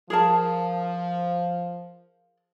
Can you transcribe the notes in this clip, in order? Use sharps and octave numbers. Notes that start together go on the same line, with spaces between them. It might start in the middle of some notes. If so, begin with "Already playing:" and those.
F3 G#4 A#4 A5